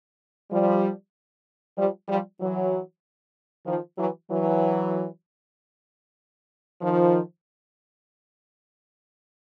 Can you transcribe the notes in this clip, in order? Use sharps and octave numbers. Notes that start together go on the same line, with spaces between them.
F3 G3
F3 G3
F3 G3
E3 F#3
D#3 F3
E3 F#3
E3 F#3
D#3 F3